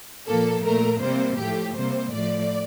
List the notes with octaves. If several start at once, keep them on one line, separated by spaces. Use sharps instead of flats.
A#2 F3 A#3 A4
A#2 A3 A#4
C3 G3 A#3 C5
A2 F3 A3 G4
C3 G3 A#3 C5
A2 F3 A3 D5